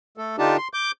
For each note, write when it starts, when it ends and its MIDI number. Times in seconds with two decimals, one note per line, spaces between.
0.18 0.36 57
0.18 0.36 69
0.38 0.57 50
0.38 0.57 62
0.38 0.57 63
0.38 0.57 65
0.38 0.57 67
0.38 0.57 81
0.57 0.68 84
0.74 0.92 86
0.74 0.92 91